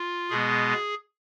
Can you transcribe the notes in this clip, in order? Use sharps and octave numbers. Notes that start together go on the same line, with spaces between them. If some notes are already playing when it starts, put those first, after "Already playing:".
Already playing: F4
B2 G#3 B3 G#4